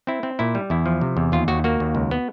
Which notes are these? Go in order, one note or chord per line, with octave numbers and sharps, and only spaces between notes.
C4 E4
C4
A#2 E4
G3
E2 E4
F3
C3
E2
D#2 F4
D#2 F#4
A#3 F#4
D#2
C#2
B3